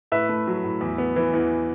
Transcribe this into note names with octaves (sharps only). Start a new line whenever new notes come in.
A2 B4 E5
A3
F#3
A2
E2
B3
E3
E2